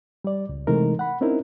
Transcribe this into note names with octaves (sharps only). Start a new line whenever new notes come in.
G3 D5
C#2
C3 E3 G#3 A3 D#4 A#4
F#5 B5
C4 C#4 D#4 E4 A#4